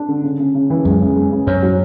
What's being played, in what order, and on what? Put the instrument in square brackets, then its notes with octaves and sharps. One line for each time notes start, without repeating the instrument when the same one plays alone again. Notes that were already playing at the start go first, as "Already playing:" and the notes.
Already playing: [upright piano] D4
D3
C#3
C#3
C#3
E3
[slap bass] F#2 [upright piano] G#3
[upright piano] C#3
G#3
C#3
[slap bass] F#2 [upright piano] C#4
[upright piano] F#3